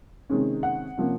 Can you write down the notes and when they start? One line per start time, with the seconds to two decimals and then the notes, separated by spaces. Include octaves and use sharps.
0.29 C3 D#3 G#3 C#4
0.63 F#5
0.97 C3 F3 A#3 C#4